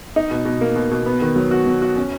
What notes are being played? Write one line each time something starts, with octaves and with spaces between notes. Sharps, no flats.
D#4
B2
B2
A#3
B2
B2
B3
D#3
F#3
F#4
F#3
F#4
C#4